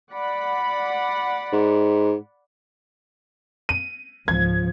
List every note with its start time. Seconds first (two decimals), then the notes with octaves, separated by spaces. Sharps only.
0.13 D5 F#5 B5
1.53 G#2
3.69 D#7
4.28 C#2 G#2 F3 G#6